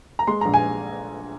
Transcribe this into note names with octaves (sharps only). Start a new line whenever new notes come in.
A#5
G#3 C6
A#1 A#5
G#5